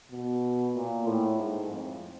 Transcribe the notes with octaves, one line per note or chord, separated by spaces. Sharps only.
B2
A#2
A2
G#2
F2